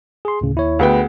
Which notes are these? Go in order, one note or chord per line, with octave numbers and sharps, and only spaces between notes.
G#4 C6
D2 A2 C#3
D#2 E4 C#5
D2 B3 G#4 F#5 G5